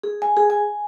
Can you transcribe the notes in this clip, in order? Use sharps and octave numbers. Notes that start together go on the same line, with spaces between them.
G#4
G#5
G#4
G#5